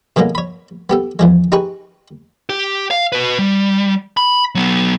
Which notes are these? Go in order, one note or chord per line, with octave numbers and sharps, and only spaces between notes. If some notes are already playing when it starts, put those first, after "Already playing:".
B2 D3 F#3 G#3 A#3
C#5 B5
B3 G4 A4
E2 F3 G#3
D#4 G4 G#4 B4 C#6
G4
F5
F#4 B4
G3
B5
F#3 B3